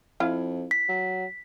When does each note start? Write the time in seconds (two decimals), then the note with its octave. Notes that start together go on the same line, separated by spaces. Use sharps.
0.20 F2 E4 F4
0.71 B6
0.89 F#3